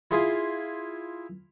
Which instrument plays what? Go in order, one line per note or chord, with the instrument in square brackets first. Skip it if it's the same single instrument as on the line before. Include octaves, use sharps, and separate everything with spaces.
[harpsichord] E4 F4 G#4